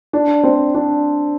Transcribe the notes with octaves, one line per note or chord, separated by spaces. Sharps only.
D4
C4
D4